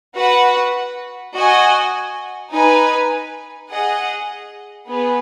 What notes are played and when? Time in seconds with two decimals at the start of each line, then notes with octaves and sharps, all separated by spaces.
0.16 F#4 B4 F#5
1.34 F#4 D#5 G#5
2.52 D#4 B4 G#5
3.71 G#4 D#5 F#5
4.89 B3 G#4 B4